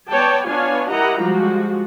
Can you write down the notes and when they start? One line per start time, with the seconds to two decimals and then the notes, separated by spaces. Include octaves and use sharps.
0.11 B3 C#5 D5 G5 A5
0.47 B3 D4 F4 C#5 F5 G#5
0.90 E4 G4 A#4 D#5 F#5 A#5
1.19 F3 G3 G#3 F4 F#4